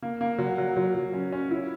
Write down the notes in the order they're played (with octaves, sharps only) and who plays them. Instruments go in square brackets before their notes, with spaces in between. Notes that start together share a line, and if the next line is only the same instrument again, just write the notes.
[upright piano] A#3
A#3
F#3
F#3
F#3
F#3
C#4
C#4
E4